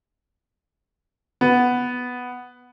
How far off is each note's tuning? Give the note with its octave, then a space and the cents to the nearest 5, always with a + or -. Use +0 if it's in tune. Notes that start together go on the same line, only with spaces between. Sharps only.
B3 +0